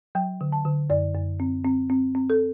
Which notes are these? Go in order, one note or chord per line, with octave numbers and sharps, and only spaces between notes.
F#3 G5
D3
A5
D3
F#2 D5
F#2
C4
C4
C4
C4
A4